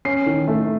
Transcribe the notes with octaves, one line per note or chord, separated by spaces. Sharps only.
C#4 C7
D#3
A3